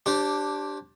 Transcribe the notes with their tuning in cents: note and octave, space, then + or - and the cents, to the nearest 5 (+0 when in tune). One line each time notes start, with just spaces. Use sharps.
D4 +0 G4 -10 C5 +40